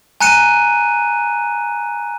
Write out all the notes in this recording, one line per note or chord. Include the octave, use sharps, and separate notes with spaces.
G#5 A#5 F#6 C#7 D#7